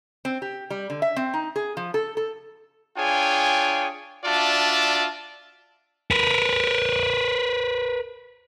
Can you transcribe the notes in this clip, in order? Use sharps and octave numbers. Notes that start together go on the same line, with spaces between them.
C4
G4
G3
D3
E5
C4
D#4
G#4
F3
A4
A4
D4 F4 G#4 C#5 G5 G#5
D4 F4 F#4 D5 E5 A5
A#4 B4